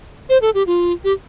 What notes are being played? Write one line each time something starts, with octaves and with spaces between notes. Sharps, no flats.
C5
A4
G4
F4
G4